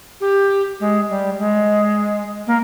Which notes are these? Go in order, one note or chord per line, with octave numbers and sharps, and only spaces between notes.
G4
G#3
G3
G#3
A#3